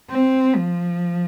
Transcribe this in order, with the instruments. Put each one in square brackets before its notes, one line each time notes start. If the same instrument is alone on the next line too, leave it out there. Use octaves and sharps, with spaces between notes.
[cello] C4
F3